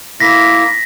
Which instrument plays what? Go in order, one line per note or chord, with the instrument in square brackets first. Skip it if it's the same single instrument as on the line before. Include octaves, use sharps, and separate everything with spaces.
[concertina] A#3 E4 E5 [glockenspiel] A#6 B6